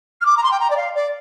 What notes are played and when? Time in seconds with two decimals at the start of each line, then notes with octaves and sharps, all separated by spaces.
0.21 F6
0.25 D6
0.37 A#5
0.43 C6
0.51 G5
0.60 A#5
0.70 D5
0.77 F5
0.95 D5